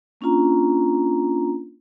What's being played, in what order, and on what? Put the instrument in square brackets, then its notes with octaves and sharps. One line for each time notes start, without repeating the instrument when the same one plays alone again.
[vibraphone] A#3 C#4 D4 F4 A#5